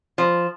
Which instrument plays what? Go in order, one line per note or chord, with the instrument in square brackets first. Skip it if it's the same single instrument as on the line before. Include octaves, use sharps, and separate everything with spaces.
[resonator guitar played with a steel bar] F3